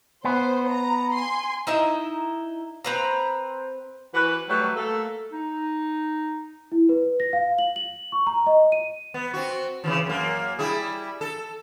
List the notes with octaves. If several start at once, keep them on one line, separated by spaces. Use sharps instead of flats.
B3 C5
A#5
G#5 C6
D#4 E4 D#5 E5
C4 B4 A#5
E3 F#4 B4
F#3 G3 A3 B4
A3 A#3 A4
D#4
E4
B4
A#6
F5
F#7
F#7
C#6
A#5
D#5
D#7
B3
C4 F#4
C#3 E3 F3
F#2 A#3
G3 E4 G#4
A4